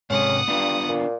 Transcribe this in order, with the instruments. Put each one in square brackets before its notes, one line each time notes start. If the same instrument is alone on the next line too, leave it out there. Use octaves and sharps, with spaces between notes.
[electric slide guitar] G#2 C3 G#3 [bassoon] C#4 [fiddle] F#5 D#6
[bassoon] G2 [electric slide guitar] B3 D4 F4
[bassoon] A#2